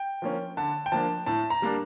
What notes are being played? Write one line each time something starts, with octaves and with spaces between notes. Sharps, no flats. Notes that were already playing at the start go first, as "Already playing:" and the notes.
Already playing: G5
F3 A#3 C#4
D3 A5
G5
F3 A#3 D4 A5
A2 A5
A#5
G3 A#3 D4